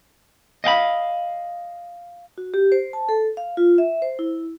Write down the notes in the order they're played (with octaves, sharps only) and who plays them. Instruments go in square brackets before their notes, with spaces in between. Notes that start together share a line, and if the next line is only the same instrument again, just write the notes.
[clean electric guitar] D#5 F5 G5 B5
[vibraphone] F#4
G4
C5
A5
A4
F5
F4
E5
C5
E4